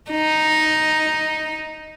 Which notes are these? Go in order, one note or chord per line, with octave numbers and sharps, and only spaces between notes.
D#4